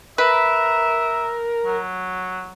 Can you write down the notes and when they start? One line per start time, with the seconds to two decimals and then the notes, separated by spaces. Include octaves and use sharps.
0.18 A#4 B4 E5
1.65 F#3